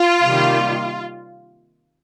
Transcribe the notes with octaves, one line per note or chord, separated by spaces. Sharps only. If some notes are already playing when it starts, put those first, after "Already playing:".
Already playing: F4
C3 D#3 G3 A#3